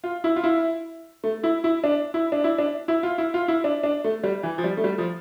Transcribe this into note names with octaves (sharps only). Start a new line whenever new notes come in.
F4
E4
F4
E4
A3
E4
E4
D4
E4
D4
E4
D4
E4
F4
E4
F4
E4
D4
D4
A3
G3
E3
F3
G3
A3
G3
F3